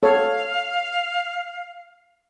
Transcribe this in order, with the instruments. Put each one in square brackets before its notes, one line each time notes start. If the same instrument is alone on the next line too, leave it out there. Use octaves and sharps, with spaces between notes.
[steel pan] A4 C#5 [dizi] F5